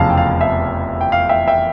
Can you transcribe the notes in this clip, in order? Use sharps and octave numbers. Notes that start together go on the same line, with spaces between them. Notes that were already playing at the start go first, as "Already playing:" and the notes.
Already playing: F1 E2 C#3 F3 F5 A5
G5
F5
E5
G5
F5
E5 G5
E5 G5